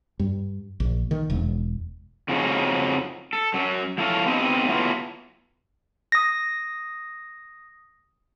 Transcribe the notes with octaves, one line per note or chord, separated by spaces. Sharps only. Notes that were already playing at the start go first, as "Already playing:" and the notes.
G2
A#1
D#3
E1
F2 C#3 F3 F#3 C#4 D#4
A4
F#2 F#3
F3 E4 A4 C#5 F5
B3 C4 D#4 G4 D#5 E5
F#3 A3 B3 E4 F4
D#6 A#6